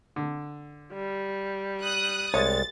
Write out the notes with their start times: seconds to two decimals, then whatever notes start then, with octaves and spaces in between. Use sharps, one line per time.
0.16 D3
0.93 G3
1.82 D#6 F#6
2.34 C2 G#3 C#5 A6